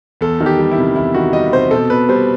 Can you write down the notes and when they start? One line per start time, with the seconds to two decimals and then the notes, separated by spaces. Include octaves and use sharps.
0.21 E2 A4
0.41 D#3
0.46 G4
0.59 G3
0.71 E4
0.77 C3
0.96 E2 E4
1.14 D#3 F#4
1.33 G3 D#5
1.53 C3 C5
1.71 B2 A4
1.90 B2 B4
2.09 G3 C5